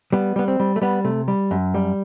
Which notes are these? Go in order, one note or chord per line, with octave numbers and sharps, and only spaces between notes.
G3 B3
G3 B3
C4
G3
A3
G3 B3
C3 A3
G3
F#2
G3